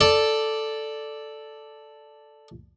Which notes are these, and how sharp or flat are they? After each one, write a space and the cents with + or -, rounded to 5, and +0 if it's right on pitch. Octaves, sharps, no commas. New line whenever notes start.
A4 +0 D5 +0